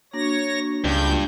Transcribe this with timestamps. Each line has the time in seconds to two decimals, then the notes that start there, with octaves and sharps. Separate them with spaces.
0.13 A#3 D4 F#4 C#5 A#6
0.84 C#2 G2 G6